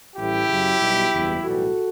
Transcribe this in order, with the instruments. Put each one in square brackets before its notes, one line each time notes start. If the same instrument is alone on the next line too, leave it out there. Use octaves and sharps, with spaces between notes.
[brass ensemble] A1 A2 G3 E4 G4
F#2 C#3 F#3
B1 B2 G3
F#1 E2 B2 G3
B1 A2 E3 G3 F#4 A4